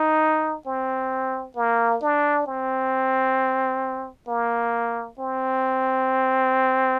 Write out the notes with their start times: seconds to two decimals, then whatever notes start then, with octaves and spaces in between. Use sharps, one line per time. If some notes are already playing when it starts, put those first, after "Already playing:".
Already playing: D#4
0.66 C4
1.56 A#3
2.02 D4
2.46 C4
4.28 A#3
5.19 C4